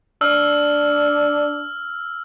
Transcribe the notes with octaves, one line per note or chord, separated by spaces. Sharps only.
D4 E6 F6